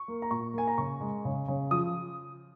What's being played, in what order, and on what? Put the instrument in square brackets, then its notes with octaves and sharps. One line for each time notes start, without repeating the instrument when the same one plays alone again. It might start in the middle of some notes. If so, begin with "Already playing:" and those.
Already playing: [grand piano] C#6
A#3
A#5
A#2 C#6
A#3 G#5
A#5
C#3 C#6
G#3
C#3
C#3
F3 D#6